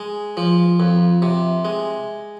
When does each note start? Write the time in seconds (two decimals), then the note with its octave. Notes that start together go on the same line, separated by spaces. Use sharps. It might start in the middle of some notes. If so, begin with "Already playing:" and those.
Already playing: G#3
0.37 F3
0.80 F2
1.22 C3
1.65 G#3